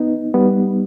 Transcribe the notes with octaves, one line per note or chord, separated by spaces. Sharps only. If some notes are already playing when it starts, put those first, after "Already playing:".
Already playing: B3 D#4
G3 B3